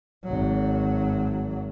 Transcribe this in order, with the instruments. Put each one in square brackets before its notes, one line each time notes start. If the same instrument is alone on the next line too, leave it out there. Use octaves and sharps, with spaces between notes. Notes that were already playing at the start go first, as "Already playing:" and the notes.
[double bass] G#1 F#3